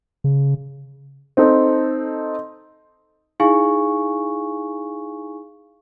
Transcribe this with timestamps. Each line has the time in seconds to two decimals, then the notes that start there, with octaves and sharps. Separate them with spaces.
0.24 C#3
1.37 C4 D#4 A4
3.40 D#4 E4 G#4 F5 G#5 C#6